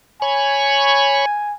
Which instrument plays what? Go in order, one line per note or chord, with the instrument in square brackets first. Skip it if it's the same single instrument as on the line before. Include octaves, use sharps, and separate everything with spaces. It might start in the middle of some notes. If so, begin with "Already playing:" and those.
[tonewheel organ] C#5 B5 C#6 [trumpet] G#5